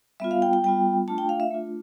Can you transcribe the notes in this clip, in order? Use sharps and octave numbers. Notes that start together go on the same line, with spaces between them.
G3 B3 F4 E5
F5
G5
G5
G3 B3 F4 G5
A3 D4 F4 A5
G5
F5
E5
A3 D4 F4